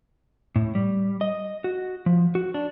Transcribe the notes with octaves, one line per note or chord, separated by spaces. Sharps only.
A2
G3
D#5
F#4
F3
F#4
D4